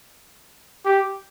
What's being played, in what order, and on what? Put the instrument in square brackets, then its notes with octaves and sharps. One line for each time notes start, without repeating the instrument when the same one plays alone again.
[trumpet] G4